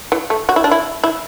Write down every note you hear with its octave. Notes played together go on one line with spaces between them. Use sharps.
E3
A3
F#4
E4
D4
E4
E4